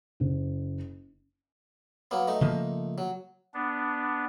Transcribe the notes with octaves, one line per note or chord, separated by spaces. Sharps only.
F#1
F#3 A#3 B3
A3 D#4
C#3 F3 A#3
F#3
B3 D4